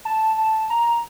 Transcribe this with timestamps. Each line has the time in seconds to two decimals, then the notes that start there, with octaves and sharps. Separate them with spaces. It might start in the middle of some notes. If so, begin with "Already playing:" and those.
0.05 A5
0.38 A5
0.70 A#5